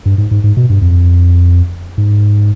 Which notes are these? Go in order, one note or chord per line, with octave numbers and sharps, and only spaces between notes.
G2
G#2
G#2
G#2
B2
G2
F2
G#2